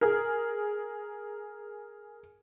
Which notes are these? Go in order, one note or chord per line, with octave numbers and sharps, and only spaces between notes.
G#4 A#4